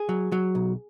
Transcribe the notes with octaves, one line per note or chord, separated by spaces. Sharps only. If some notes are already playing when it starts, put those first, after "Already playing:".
Already playing: G#4
F#3
F#3
B1